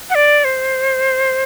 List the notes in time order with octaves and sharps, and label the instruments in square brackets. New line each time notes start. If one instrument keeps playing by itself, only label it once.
[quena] F#5
D5
C5